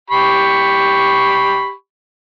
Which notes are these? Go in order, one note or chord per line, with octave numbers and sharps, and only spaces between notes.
G4 B5 C#6